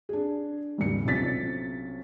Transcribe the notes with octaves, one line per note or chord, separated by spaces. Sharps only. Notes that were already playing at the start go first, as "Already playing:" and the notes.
D4 G#4
G#1 D#2 C#3 G3 C#7
B1 C3 C#4 F4 A6 B6